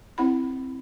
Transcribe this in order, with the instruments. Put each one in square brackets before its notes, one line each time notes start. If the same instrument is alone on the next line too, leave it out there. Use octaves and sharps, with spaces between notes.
[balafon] C4 E4 B5